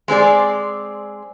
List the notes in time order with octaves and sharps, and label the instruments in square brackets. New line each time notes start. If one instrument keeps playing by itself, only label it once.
[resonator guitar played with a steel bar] G#3 C4 G#4 D5